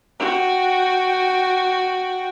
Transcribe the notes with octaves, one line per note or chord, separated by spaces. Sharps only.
F#4 G5